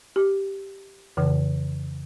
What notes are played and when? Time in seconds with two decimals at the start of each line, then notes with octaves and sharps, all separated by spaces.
0.16 G4
1.17 F2 C#3 E3